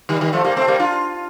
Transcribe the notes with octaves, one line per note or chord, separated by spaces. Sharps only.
D#3 G3
D#3 G3
F3 A3
G3 A#3
A3 C4
G3 A#3
D4 F4